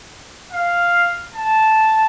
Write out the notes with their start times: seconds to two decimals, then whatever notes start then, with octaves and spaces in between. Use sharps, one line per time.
0.52 F5
1.34 A5